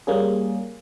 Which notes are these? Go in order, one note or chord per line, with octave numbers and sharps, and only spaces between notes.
G3 A#3 C#4 G#4